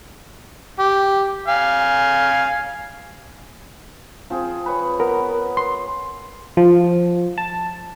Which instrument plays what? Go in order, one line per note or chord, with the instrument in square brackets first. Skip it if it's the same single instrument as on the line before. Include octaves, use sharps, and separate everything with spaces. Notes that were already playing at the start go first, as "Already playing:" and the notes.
[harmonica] G4
F5 G#5
[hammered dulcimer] F3 C4 G#4
B4 C#5
[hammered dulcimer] B3 [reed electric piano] A#4
[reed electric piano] C6
[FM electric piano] F3
A5